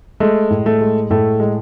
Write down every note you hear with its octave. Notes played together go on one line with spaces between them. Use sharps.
G#3 A3
A2
A3
G#3
A2 A3
G#3